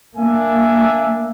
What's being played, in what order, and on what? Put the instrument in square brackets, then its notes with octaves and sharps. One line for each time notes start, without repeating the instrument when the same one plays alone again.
[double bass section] A#3 [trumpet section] D4 E5 G#5